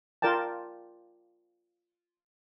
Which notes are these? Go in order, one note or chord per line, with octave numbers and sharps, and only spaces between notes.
F4 A#4 D5 G5 A5